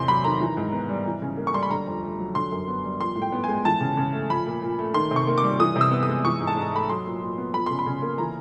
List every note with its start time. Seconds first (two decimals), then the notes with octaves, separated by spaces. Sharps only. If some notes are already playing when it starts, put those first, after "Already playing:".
Already playing: E2 C3 C6
0.08 F#3 B5
0.24 D#3 A#5
0.40 E3
0.57 G#2
0.72 B3
0.89 G3
1.06 E3
1.22 C#3
1.37 A#3
1.47 C#6
1.54 G3 C6
1.63 B5
1.70 D3 A#5
1.87 F2
2.02 A3
2.19 F#3
2.35 D3 C6
2.52 F#2
2.68 B3
2.83 G3
2.99 F3 C6
3.16 A2
3.22 G5
3.32 B3
3.44 G#3 G#5
3.65 E3 A5
3.81 C#3
3.97 C#3
4.13 A3
4.30 F3 B5
4.46 A#2
4.62 A#2
4.79 A3
4.94 D#3 C6
5.11 C3
5.16 C#6
5.27 A#3
5.38 D6
5.43 G3
5.59 E3 D#6
5.76 C3
5.81 E6
5.91 B3
6.03 D#6
6.08 G#3
6.24 E3 C#6
6.40 G#2
6.47 A5
6.57 G#2 A#5
6.72 A3 B5
6.89 F#3 C6
7.06 A#2
7.21 A#2
7.38 B3
7.54 F3 B5
7.66 C#3 C6
7.79 B5
7.86 C#3
8.02 A#3
8.18 E3 A#5